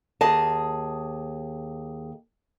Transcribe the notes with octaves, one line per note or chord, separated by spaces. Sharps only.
D#2 G#4 D#5 A5